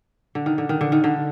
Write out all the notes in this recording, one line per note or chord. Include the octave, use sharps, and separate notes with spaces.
D3
D#3
D3
D#3
D3
D#3
D3